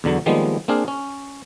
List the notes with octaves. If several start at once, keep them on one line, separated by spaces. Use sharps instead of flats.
E2 D3 F#3
D#3 F3 G3 G#3 A#3 B3
A#3 C4 D4 G#4 F5
C#4